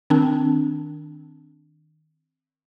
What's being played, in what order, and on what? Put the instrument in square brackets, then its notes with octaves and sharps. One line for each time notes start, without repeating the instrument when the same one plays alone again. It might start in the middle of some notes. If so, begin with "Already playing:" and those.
[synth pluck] D#3 C4 D4